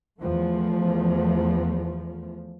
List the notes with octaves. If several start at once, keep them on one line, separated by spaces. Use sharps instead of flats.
E2 F3 A3